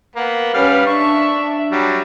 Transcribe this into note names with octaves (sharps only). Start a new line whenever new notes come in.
A#3 B3
G3 C#4 B4 F5
D4 E5 C#6
F#3 G3